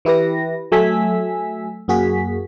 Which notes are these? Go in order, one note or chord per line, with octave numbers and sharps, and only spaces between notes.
E3 E4 G4 B4 A#6
F#3 A3 G#5 E6 B6
F#2 A#3 F#4 G#4 B6